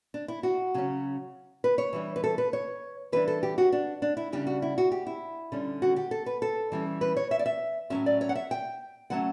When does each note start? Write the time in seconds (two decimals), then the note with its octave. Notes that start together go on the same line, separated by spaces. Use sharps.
0.14 D4
0.28 E4
0.43 F#4
0.74 C#3 F#3 C#4
1.64 B4
1.78 C#5
1.93 E3 G3 D4
2.16 B4
2.24 A4
2.38 B4
2.53 C#5
3.12 E3 G3 D4 B4
3.28 A4
3.43 G4
3.58 F#4
3.72 D4
4.02 D4
4.17 E4
4.32 C#3 G3 D4 G4
4.47 F#4
4.62 E4
4.78 F#4
4.92 G4
5.07 E4
5.52 D3 G3 C#4
5.82 F#4
5.96 G4
6.11 A4
6.26 B4
6.42 A4
6.72 E3 G3 C#4
7.01 B4
7.17 C#5
7.31 E5
7.39 D5
7.46 E5
7.90 A2 F#3 A3 C#4 E5
8.06 D5
8.21 C#5
8.29 F#5
8.35 E5
8.51 G5
9.10 D3 F#3 A3 C#4 F#5